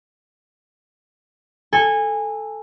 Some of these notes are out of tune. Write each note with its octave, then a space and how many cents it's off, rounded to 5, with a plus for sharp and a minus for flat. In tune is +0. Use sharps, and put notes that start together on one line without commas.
A4 +0 G#5 -20